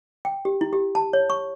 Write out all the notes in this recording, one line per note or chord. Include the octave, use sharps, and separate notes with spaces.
G5
G4
E4
G4
A5
C#5
C#6